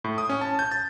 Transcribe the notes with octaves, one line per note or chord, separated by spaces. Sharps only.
A2
D#6
C#4
A5
G6
A6